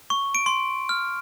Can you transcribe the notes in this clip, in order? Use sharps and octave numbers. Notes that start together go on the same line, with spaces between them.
C#6
D7
C6
F6